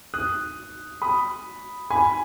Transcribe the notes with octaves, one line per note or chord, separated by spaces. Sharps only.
D#6 F#6
B5 D#6
G#5 B5